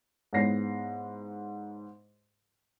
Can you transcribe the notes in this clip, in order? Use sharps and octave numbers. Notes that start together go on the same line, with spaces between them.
G#2 B3 E4 C#5 A#6 C7